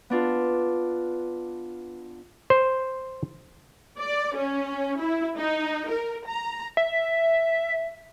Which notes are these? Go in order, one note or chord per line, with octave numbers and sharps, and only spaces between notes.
B3 D4 F4
C5
D5
C#4
E4
D#4
A#4
A#5
E5